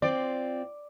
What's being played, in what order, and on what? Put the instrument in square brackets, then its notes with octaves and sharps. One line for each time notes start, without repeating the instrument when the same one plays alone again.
[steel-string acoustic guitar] C4 F4 [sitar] D5